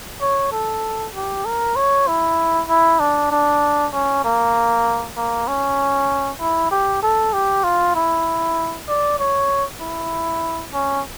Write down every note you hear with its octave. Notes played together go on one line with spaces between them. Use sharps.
C#5
A4
G4
A#4
C#5
E4
E4
D4
D4
C#4
A#3
A#3
C#4
E4
G4
A4
G4
F4
E4
D5
C#5
E4
C#4